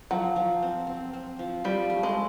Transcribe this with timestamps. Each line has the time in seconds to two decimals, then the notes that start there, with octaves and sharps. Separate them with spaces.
0.11 F3 F#3
0.36 F3
0.62 C4
0.87 C4
1.13 C4
1.39 F3
1.64 F3 G3
1.90 A3
2.03 G#3